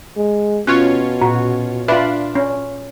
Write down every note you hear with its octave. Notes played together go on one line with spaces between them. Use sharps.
G#3
B2 C#4 F4 C#5 F#6
A#2 F#4
D4 F4 B4 E5
C#4